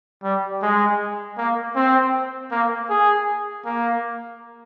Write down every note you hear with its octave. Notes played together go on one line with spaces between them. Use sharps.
G3
G#3
A#3
C4
A#3
G#4
A#3